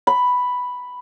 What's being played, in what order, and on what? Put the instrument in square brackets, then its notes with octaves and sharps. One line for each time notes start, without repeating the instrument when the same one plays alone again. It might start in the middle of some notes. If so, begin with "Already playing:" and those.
[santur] B5